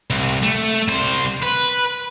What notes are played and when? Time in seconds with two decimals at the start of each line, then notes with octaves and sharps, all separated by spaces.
0.10 C2
0.43 A3
0.88 C2 C5
1.43 B4